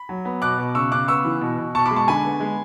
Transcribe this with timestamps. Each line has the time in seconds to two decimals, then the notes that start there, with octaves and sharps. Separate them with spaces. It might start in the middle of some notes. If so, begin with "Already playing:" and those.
Already playing: B5
0.09 F#3
0.25 B3
0.42 B2 D6 F#6
0.58 B2
0.75 C#3 C#6 E6
0.91 C#3 D6 F#6
1.08 B3 C#6 E6
1.25 E3
1.41 B2
1.58 B2
1.74 B2 A5 C#6
1.85 B5 D6
1.91 G#3
1.96 A5 C#6
2.08 D3 G#5 B5
2.24 B3
2.40 G#3